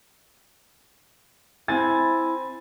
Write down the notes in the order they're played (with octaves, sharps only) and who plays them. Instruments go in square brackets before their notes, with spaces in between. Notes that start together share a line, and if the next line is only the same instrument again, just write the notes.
[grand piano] C4 G#5 A6 [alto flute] E4